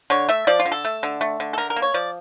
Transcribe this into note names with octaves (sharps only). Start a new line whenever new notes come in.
D3 C#5
A3 E5
F3 D5
F4
D3
A4
A3
D3
A3
D3
A4
D3 A#4
A#4
A#3
C#5
F3 D5